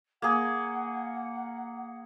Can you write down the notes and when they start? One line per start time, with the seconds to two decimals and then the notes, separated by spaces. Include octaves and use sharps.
0.22 A#3 G#4 F#5